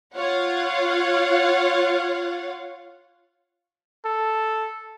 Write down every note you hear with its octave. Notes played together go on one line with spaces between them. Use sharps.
F4 C#5 F5 F#5
A4